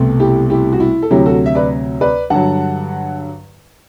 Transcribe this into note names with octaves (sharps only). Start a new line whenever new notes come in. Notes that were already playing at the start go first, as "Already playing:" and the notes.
Already playing: C2 B2 A3 C4
E4 G4
E4 G4
F#4
E4
A4
D2 C3 F#3 E4 G4
F#4 A4
E5
B4 D5
B4 D5
G2 D3 F#3 F#5 A5